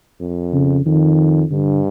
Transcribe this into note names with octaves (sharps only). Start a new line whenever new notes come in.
F2
C#3
F2 D#3
G2 D3